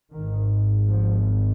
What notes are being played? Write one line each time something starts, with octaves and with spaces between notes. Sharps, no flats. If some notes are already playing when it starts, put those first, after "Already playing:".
G#1 G#2 D#3
F3